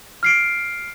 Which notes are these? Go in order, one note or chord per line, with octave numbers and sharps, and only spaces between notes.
F6 C7 D7